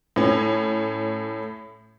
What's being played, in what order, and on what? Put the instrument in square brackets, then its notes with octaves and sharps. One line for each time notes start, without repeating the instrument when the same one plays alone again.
[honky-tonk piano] A2 C#4